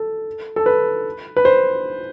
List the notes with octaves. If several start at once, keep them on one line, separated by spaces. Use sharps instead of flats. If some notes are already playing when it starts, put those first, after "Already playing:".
Already playing: A4
A4
B4
B4
C5